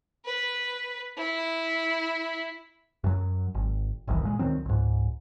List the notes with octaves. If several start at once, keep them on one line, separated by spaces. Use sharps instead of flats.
B4
E4
F#2 F#3
G#1
G1 C2 D#3 E3
A#2 G#3
D2 D#3 F#3 C4
C#2 G#2